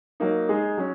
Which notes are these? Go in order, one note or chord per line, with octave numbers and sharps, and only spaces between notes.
F#3 A#3 D#4
G#3 D#4 G#4
F#3 C#4